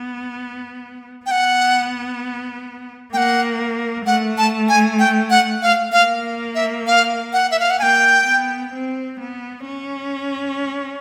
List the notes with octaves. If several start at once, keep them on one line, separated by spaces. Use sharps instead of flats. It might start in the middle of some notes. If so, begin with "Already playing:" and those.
Already playing: B3
B3 F#5 G5
A#3 F#5 G5
A3 F#5
A5
G#5
G5
F#5
F5
A#3 F5
E5
F5
F#5
E5
F5
F#5
A#3 G5 G#5
B3
C4
B3
C#4